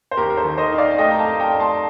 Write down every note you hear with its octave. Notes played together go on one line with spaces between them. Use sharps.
C5
D#2 G4 A#4
A#4
A4 C5
D#3
C5 D#5
D#4
D5 F5
A3 D#5 G5
A#5
F5 A5
A3
G5 A#5
A3 A#5
A5 C6